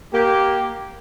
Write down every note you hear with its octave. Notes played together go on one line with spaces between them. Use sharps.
A#3 G4